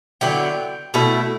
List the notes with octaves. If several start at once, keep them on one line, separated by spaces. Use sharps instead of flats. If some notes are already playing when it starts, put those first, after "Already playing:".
D3 F#3 B3 E4 G5
B2 A3 E4